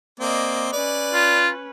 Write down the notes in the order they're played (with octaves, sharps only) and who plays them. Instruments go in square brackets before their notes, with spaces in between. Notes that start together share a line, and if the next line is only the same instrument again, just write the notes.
[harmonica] A#3 C4 [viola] D5 D#5
[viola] C#4 B4 [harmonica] D5
[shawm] F4